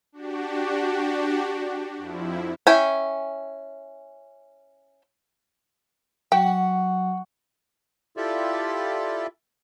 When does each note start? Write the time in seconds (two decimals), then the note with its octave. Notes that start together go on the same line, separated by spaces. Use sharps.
0.12 D4 F#4 G4
1.97 F2 F3 E4
2.67 C#4 E4 G5 G#5
6.32 F#3 F#4 G5
8.17 E4 F4 G4 A4 D5 E5